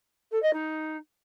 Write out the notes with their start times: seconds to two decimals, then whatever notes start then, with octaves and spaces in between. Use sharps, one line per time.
0.31 A4
0.42 D#5
0.53 D#4